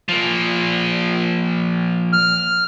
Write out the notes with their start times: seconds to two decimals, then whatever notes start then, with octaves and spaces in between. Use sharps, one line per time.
0.09 F3 A#3
2.13 F6